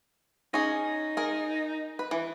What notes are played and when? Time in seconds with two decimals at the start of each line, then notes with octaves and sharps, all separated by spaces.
0.54 C#4 D#4 G#4
1.17 G#4 A#4
1.99 B4
2.11 E3